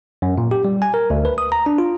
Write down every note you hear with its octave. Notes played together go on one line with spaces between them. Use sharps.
F#2
A#2
G4
G3
G#5
A#4
D2
B4
D#6
A#5
D4
F4